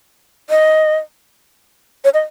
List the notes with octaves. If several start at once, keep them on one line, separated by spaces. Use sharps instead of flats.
D#5
C#5
D#5